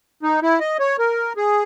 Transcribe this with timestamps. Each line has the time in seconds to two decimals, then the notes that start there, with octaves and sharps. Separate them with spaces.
0.23 D#4
0.42 E4
0.60 D#5
0.79 C#5
0.99 A#4
1.37 G#4